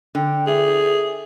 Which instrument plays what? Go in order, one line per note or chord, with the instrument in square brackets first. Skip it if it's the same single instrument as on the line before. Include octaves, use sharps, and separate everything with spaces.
[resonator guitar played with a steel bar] D3 [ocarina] G5
[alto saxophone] G#4 [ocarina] E5